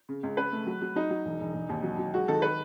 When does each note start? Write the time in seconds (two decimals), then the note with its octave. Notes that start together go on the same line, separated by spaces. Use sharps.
0.09 C#3
0.23 C#2
0.37 C#3 B4
0.52 A3
0.67 F#3
0.82 F#3
0.95 F#3 D#4
1.10 F#3
1.25 E1
1.40 E1
1.54 E1
1.69 D#2
1.83 F#3
1.98 F#3
2.14 G#3 F#4
2.28 D#3 A4
2.42 B4